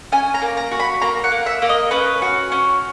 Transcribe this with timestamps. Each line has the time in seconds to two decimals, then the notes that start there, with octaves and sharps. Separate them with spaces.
0.12 C#4 G#5
0.34 A#5
0.42 A#3
0.57 A#5
0.71 F#4
0.80 B5
1.01 A#3 A#5
1.24 F#5
1.32 A#3
1.46 E5
1.62 A#3
1.69 D#5
1.91 C#4 B4
2.22 F#4
2.52 C#4